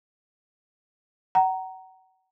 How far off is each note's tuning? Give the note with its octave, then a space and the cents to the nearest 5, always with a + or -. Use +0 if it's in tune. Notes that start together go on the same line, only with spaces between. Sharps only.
F#5 +35 A#5 +0